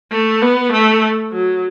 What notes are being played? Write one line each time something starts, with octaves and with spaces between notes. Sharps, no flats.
A3
B3
A3
F#3